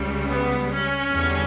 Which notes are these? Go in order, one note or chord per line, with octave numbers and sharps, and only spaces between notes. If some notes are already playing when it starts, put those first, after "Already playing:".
Already playing: C#2 C#3 G3
B3
C#4
E2 D3 G3